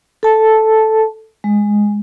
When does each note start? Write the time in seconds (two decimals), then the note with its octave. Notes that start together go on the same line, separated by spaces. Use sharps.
0.23 A4 A5
1.44 G#3